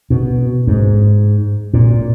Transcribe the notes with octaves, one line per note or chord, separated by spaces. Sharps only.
B2
G#2
A#2